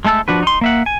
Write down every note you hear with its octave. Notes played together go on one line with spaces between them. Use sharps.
G#3 A3 A4 A5 E6
F3 D4 F#4 B4
D#4 C6
A#3 E5 F#5
G#5